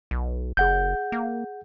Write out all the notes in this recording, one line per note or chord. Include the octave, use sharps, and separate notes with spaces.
B1
F#1 G#4 F#5 G6
A#3